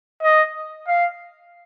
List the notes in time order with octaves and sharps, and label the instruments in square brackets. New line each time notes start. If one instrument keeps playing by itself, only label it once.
[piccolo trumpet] D#5
F5